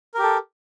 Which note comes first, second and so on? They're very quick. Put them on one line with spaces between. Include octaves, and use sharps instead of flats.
A#4 G4 A4